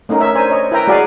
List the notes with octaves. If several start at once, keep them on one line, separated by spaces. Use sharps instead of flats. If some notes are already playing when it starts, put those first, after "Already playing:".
A3 C#4 D#4 A#4
A#4 C#5 E5
D4 A#4 C5 G#5
C#5 D#5
E4 A#4 B4 E5 G5 A#5
G#3 F#4 D5 F5 G#5